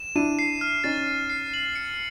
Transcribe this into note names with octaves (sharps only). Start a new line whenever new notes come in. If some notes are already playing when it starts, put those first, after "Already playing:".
Already playing: E7
D4 E4 D#7
C7
F6
C#4 D#4 A6
D#7
C7
F#7
C#7